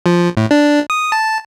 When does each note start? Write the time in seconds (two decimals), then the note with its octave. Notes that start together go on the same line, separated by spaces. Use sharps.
0.06 F3
0.37 A2
0.51 D4
0.90 D#6
1.12 A5